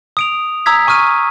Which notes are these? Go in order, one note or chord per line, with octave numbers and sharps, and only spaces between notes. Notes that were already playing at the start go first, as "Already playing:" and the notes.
D#6 D7 F7
A#5 D#6 E6 G#6 B6
G#5 C#6 D#6 F6 D#7